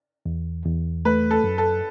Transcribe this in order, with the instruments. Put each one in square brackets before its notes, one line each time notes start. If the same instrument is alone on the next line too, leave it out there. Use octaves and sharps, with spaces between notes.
[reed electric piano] E2
E2
[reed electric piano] A3 [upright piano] B4
[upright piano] A4
[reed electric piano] F#2
[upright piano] A4